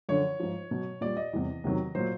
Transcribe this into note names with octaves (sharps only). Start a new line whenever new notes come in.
F#2 D3 F3 C#5
G#2 F3
B2 F#3
A#2 G3 D5
D#5
E2 C3 E3 G3
E2 C3 D#3 F#3
A#2 F#3 C5